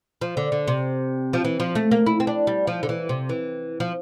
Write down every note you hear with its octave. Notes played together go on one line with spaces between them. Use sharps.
F3
D3
D3
C3
F3
E3
F3
A3
A#3
E4
C4
D4
G3
F3
D3
E3
C3
E3
F3